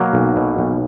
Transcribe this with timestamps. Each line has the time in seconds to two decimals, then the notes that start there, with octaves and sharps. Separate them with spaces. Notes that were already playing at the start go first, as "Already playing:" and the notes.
Already playing: B2 F#3 A#3
0.13 B1
0.36 B2
0.58 B1